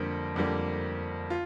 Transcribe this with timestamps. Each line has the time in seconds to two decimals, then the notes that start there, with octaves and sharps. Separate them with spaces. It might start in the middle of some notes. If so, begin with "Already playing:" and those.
Already playing: F2 D3 G3 A#3
0.36 F2 D3 G3 A#3
1.30 F4